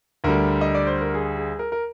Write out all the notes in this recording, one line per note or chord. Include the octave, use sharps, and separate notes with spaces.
D2 D3 G3 A#4
D#5
D5
C5
A#4
G#4
G#4
A#4
A#4